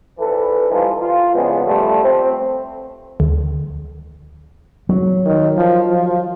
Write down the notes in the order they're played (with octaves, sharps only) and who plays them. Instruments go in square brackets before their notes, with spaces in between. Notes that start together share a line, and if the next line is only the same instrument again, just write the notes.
[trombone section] A#1 E3 A4 B4
E3 F3 G3 C4 D#4 F4
F4
A#1 F2 C#3 E3 G#3 B3
F3 G3 A3
C4
[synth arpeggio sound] D2
[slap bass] F#3
[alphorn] D#3
F3
F3